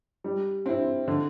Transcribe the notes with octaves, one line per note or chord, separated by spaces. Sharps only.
G3
C4 E4
D3